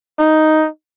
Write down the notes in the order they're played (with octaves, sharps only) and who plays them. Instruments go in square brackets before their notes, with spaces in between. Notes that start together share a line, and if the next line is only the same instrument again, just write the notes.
[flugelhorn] D#4